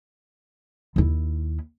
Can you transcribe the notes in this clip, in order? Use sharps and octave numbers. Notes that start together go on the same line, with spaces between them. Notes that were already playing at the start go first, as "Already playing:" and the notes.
D#2 E4